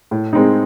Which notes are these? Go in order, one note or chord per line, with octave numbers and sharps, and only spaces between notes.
A2
G#3 C4 D#4